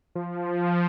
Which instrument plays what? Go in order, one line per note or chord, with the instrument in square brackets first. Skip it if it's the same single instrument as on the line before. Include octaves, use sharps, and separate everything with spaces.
[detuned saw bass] F3